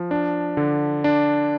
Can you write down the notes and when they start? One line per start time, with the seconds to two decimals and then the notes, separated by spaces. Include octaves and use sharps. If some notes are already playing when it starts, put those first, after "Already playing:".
Already playing: F3
0.11 D4
0.57 D3
1.04 D4